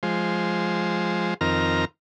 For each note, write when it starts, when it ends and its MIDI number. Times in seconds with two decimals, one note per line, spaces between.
0.03 1.34 53
0.03 1.34 56
0.03 1.34 72
1.41 1.85 41
1.41 1.85 51
1.41 1.85 60
1.41 1.85 70
1.41 1.85 82
1.41 1.85 89